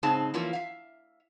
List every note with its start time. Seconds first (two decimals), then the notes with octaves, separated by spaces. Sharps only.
0.03 G#2 C#3 C4 D#4 G#4 A5
0.34 E3 F3 A#3 C#4 E4 F4
0.53 E5 F5